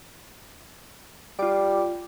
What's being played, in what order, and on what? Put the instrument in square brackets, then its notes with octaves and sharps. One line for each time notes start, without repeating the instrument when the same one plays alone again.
[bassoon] G3 [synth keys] F4 D6